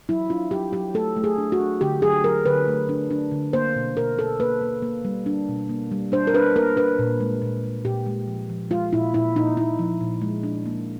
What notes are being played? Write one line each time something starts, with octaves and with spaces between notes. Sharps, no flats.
F#3 E4
D4 F4
F#3 G4
F#3 G4
A3 A4
A3
G#4
D4
F#4
D4
D3 G4
F#3 G#4
F#3 A#4
D3 B4
A3
D4
D4
D3
A#3 C5
B2
B2 A#4
A#3 A4
A#3 B4
A#3
A#3
G3
D4
B2
A#3
G3
D4 C5
A#4
D4 B4
A#3 A#4
D4 B4
A#2
G#3
A#2
G#3
A#2 G4
G#3
F3
F3
G#3 F4
A#2 E4
A#2 E4
A#2 D#4
A#2 E4
F3
A#2
G#3
D4
A#3